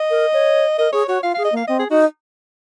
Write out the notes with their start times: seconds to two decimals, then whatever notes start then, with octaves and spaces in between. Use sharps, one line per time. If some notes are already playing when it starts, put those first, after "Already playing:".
Already playing: D#5
0.10 A#4
0.33 C#5
0.78 A#4 D#5
0.92 G#4 C#5
1.08 F#4 C#5
1.23 F4 F5
1.34 G#4 F5
1.45 D#5
1.52 A#3 F5
1.67 C4 D#5
1.79 G#4
1.90 D#4 F#4